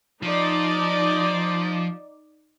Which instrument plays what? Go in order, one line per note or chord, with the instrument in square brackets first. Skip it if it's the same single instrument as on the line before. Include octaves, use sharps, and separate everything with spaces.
[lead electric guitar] F3 [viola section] D#4 D5